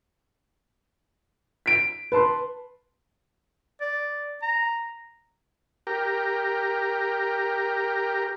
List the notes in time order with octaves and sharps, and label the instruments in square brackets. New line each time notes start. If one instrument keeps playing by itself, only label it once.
[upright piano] B6 D7
B4 A5 C6
[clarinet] D5
A#5
[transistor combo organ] G4 A#4